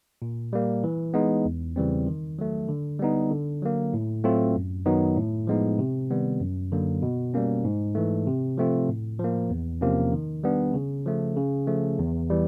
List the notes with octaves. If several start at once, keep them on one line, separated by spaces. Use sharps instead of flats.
A#2
G3 A#3
E3
G#3 B3 D#4
E2
C#3 E3 G3 C4
D#3
F#3 A3
D3
G3 B3 D#4
D3
F#3 A#3
A2
F#3 A3 C4 F4
F#2
D#3 F#3 B3 D#4
A2
F3 G#3 B3 D#4
C3
D#3 G3 B3
F#2
D3 F#3 A#3
B2
G3 A#3 C#4
G#2
E3 A3
C3
F3 A3 C4 F4
A2
F3 A#3
E2
C3 F3 A#3 C#4
D#3
G3 B3 D4
C#3
F3 A3
C#3
F3 A3
E2
E3 G3